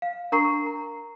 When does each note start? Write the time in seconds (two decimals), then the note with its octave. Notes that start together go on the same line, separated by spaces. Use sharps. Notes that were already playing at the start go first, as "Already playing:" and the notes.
0.02 F5
0.32 D4 A#4 A#5 C#6 C7
0.66 A#5